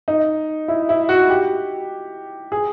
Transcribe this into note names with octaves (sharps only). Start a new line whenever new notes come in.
D#4
E4
E4
F#4
G4
G#4